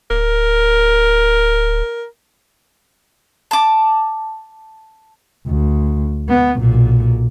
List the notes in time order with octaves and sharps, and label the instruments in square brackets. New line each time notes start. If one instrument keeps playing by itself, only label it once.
[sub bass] D1 [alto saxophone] A#4
[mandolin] A5 D6
[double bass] D2
B3
B1 A#2